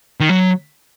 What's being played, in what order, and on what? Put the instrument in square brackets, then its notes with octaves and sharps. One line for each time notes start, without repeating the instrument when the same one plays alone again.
[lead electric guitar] D#3
F#3